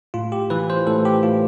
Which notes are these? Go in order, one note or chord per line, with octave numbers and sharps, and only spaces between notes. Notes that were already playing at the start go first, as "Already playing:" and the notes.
A2 F4
G4
E3 B4
C5
A2 A4
G4
A2 F4